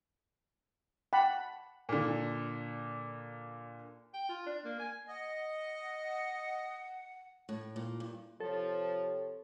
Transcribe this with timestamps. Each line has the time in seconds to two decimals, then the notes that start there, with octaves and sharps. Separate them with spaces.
1.13 F#5 G5 A5 B5 D6
1.89 A#2 D3
4.13 G5
4.29 F4
4.46 D4
4.65 A#3
4.80 G#5
5.08 D#5 F#5
7.49 A2
7.76 A#2
8.00 G2
8.40 C3 F3 A4 C#5